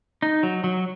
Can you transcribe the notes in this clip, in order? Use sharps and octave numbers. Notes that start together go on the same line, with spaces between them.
D#4
F#3
F#3